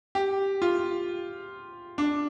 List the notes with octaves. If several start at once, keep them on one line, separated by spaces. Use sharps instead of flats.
G4
F4
D4